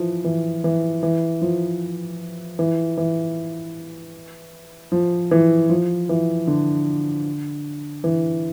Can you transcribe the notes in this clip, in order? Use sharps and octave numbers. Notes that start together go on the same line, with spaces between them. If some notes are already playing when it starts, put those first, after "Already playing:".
Already playing: E3 F3
E3
E3
E3
F3
E3
E3
F3
E3
F3
E3
D3
E3